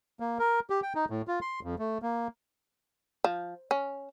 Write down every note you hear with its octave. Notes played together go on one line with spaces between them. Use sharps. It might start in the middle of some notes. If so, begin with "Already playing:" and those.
A#3
A#4
G4
G5
D#4
A2
F4
C6
F2
A3
A#3
F3
C#4